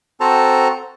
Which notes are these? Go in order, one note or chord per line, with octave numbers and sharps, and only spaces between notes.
C4 F#4 A4 C5 A5 A#5